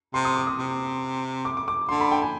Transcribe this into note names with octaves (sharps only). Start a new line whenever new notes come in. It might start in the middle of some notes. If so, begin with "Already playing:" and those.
C3 C6
D#6
D6
D#6
C3
D6
D6
D6
D3 C6
B5
G5
G#5